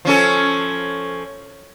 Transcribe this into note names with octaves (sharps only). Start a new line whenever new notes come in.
F3 C#4 A4